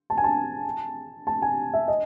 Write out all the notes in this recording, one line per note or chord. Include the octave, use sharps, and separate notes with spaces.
A5
G#5
A5
A5
G#5
E5
D#5